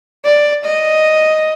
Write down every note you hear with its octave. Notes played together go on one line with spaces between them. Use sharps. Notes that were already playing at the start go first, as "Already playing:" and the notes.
D5
D#5